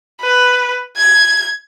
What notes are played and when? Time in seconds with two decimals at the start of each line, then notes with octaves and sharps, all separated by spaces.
0.21 B4
0.97 G#6